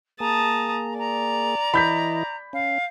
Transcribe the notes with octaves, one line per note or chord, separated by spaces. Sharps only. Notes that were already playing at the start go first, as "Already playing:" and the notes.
A#3 G#4 A5 A#5 D#6
D5 A#5
E3 E4 D#5 B5 G6 B6
C#4 F5